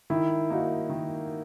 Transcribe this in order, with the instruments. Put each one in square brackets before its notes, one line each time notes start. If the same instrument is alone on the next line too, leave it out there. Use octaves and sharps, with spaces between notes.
[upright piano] D#3 [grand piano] E4
[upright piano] A#3 D#4 F#4
D#3